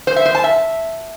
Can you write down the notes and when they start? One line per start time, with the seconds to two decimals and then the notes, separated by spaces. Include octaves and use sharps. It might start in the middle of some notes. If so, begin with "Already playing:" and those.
0.07 C5
0.16 E5
0.25 C5
0.35 A5
0.44 E5